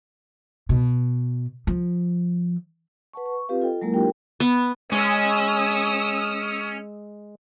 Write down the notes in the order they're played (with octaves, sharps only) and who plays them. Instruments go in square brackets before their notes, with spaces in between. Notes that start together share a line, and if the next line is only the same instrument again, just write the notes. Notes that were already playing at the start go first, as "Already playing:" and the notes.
[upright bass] B2
F3
[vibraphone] B4 F#5 A5 C#6
C#6
C4 F4 G4 B4 F5
F4 A4 D#5 G5
F#3 G#3 A#3 E4 A#4
D4 F4 G4 A#4 G5
[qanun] B3
[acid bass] G#3 [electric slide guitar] C#4 [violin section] D#6 E6